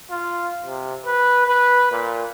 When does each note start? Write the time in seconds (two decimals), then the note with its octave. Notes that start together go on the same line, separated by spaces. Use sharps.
0.11 F4
0.65 C3
1.05 B4
1.47 B4
1.92 A#2